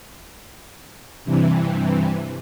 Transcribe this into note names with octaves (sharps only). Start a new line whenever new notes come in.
G2 C3 E3